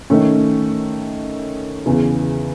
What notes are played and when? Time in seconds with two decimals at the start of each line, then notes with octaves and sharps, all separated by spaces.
0.10 D#3 A3 C#4
1.86 E2 C#3 E3